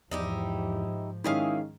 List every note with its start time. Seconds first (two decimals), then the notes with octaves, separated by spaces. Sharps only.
0.11 E2 G#2 F3 D#4 E4 G4
1.24 D#3 G#3 C#4 E4 G4 G#4 F5